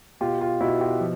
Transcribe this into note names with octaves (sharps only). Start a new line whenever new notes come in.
B2 F4 G4
F4 G4
B2 E4 F#4
F4 G4
F3